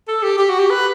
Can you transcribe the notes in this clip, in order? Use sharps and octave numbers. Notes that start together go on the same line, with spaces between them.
A4
G4
G4
F#4
G4
B4